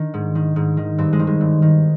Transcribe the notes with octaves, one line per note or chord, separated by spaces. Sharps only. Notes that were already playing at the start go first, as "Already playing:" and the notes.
Already playing: D#3 D4
G#2
D#3
G#2
D#3
G2 C4
G#3
D#3
G#3
G2
D#3